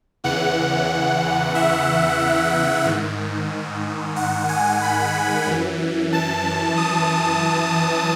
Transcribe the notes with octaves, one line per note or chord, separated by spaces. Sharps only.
E2 C#3 E3 F#5
E5
G#2 D#3
F#5
G#5
B5
F#2 E3
A5
D#6